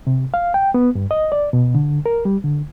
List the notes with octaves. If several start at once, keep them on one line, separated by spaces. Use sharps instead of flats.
C3
F5
G5
B3
G2
D#5
D5
B2
D3
A#4
G3
D3